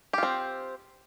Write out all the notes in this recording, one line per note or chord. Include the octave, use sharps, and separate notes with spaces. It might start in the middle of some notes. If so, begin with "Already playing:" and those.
C4 F4 G4